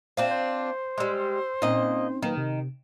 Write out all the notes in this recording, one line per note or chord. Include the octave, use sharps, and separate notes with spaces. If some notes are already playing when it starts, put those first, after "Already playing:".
C4 D4 F4 C5 E5
C5 G6
G3 G#3 C6 E6
A#2 C4 C#4 D#4 D#5
D#3 F#3 A#3 B4
C3